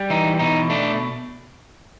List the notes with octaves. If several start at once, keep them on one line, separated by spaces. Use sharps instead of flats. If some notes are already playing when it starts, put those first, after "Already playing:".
Already playing: G3
E3 D#4
B2 D#4
A3 D4